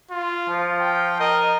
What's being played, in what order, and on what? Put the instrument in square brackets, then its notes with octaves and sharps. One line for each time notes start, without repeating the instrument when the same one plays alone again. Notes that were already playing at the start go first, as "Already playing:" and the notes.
[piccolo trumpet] F4
[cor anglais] F3
[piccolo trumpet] G5
[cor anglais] A#4 [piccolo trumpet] D#5